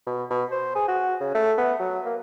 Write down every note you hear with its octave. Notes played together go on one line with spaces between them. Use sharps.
B2
B2
C5
G#4
F#4
C#3
A3
B3
F#3
A#3